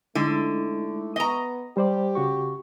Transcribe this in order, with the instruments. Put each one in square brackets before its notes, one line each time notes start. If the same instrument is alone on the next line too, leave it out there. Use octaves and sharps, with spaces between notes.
[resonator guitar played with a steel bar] D3 [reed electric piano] G#3 D#4 E4 [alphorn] A3
[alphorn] B3 [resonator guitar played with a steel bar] D#5 A#5
[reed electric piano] G3 C5 D5 [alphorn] G4
[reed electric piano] C#3 F#4 C#6